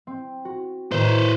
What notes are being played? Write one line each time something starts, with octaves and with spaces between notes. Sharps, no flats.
C4
F#4
A2 D#3 B4 C5